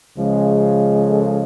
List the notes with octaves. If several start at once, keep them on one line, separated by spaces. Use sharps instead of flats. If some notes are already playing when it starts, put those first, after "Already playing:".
C#2 C#3 F3 G#3
A4